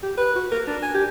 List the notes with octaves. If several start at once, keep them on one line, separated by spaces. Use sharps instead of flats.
G4
B4
F#4
A#4
D4
G#5
G4